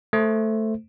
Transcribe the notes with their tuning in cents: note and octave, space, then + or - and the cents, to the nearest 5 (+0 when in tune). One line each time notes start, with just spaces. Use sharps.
A3 +0 C5 +0